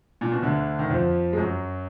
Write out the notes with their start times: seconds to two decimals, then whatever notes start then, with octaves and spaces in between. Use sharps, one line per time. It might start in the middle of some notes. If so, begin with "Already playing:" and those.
0.21 A#2
0.32 B2
0.42 D2 D3
0.79 D#3
0.90 F2 F3
1.33 G#3
1.37 F#2 F#3